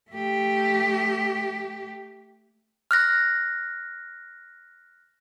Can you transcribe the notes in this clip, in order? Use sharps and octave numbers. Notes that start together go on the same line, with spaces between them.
A3 G4
F6 F#6 A#6